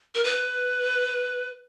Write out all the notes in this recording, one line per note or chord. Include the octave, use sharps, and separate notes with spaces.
A#4
B4